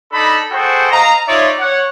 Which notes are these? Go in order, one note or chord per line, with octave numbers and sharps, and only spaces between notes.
D4 D#4 A4 B5
F#4 G#4 A4 C5 G5
D#5 F5 A#5
D#4 F4 C#5 D5 E5
C#5 F#5